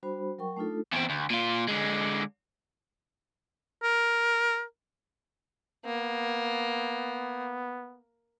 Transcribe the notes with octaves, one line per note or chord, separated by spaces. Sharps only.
G3 D4 F#4 C5 B5
F#3 A#4 G5 C#6
A3 D4 D#4 F4 A4
E2 C4
D2
A#2 F4
D3 G#3
A#4
A#3 B3